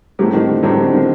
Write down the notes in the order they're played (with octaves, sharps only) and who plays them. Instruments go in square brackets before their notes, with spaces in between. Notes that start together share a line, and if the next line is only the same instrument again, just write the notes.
[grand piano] A2 A3 C4 G4 [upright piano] F#3
[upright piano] D#3
D3
[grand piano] A2 A3 C4 G4 [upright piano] F#3
[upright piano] D#3
D3
D#3